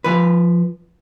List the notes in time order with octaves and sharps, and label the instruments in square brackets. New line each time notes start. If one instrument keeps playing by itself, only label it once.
[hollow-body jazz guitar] F3 B4